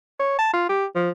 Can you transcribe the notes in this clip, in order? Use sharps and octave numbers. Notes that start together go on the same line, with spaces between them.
C#5
A5
F4
G4
F3